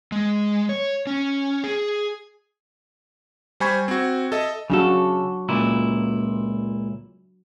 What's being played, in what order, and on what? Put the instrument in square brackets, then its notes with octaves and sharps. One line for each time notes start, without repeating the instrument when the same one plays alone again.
[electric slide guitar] G#3
C#5
C#4
G#4
[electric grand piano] G3 C5 G#5 B5 C#6 G#6
C4 F#4
A4 D#5 E5
[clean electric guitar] C#3 A4 [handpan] F#3 D4 F#4
[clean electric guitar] C#2 A#2 E4